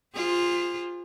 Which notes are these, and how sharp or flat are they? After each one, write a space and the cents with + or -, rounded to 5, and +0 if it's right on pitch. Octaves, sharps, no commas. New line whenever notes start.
F4 +0 G#4 -35 C5 -10